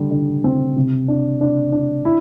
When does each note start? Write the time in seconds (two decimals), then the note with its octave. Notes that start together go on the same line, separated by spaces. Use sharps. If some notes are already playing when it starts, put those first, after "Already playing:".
Already playing: D3 G3
0.11 D3
0.44 C4
0.76 C3
1.08 D4
1.41 D4
1.72 D4
2.05 E4